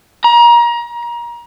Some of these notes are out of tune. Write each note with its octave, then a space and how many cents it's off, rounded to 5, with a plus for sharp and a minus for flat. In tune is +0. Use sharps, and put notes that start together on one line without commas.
A#5 +30